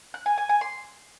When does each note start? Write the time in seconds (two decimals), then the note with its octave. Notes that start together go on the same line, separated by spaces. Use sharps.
0.14 F#6
0.26 G#5
0.38 G#5
0.49 G#5
0.61 C6